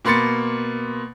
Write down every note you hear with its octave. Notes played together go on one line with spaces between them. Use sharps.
B2 A#3 B5 C6 A6 C#7